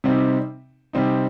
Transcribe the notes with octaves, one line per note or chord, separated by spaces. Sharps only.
C3 G3 C4 D#4
C3 G3 C4 D#4